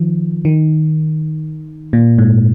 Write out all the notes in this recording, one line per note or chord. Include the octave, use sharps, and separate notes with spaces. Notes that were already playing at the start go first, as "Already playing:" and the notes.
Already playing: D#3 F3
D#3
A#2
G#2